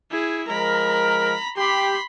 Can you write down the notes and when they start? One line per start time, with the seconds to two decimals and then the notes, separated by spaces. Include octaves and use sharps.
0.11 E4 G#4
0.49 F3 G#3 A#4 A#5 B5
1.57 G4 B5 C6